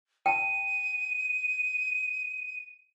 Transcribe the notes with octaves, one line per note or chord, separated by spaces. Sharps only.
G5 A5 D#7